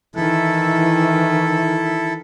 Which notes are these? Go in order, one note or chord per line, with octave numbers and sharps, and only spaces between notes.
D#3 E3 E4 A4